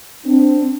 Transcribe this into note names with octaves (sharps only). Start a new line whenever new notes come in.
C4 D4